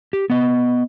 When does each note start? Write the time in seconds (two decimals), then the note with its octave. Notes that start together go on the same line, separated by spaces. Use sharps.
0.13 G4
0.30 B3 D#5